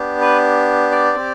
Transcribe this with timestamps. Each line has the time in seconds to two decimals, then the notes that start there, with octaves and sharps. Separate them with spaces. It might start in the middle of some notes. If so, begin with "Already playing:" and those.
Already playing: B3 D4 G4
0.21 B4
0.91 D5
1.15 C4 G4